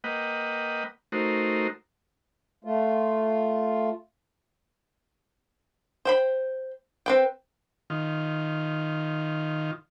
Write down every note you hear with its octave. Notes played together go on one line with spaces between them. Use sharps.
A#3 B4 D#5 F#5 G5
A3 D#4 F#4 A#4 C5
A3 F4
C5 G5 B5
C4 B4 G5
D#3 F4